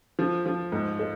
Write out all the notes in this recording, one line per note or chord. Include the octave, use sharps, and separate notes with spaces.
F3
F3
G#2
G#3